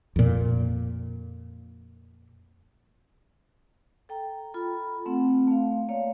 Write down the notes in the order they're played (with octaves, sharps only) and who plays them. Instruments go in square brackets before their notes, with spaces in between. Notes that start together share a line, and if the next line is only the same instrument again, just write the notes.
[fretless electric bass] F2 A#2
[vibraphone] A4 G5 A#5
F4 A4 B5
A3 C4 F#5
A3 F5
A#3 C#5 D5 F5